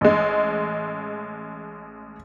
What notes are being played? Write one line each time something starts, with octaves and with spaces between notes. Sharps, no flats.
A1 G#3